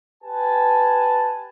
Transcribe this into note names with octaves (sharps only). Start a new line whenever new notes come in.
G4 B4 G#5 A5